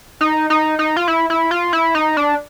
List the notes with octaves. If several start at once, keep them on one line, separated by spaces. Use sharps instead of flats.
D#4
D#4
D#4
F4
E4
E4
F4
E4
D#4
D4